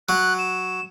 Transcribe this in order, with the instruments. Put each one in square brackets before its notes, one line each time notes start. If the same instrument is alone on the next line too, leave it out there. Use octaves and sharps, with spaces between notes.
[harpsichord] F#3 [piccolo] F#6
[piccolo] E7